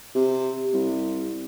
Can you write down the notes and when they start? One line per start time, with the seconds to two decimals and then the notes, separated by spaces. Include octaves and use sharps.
0.15 C3
0.73 C2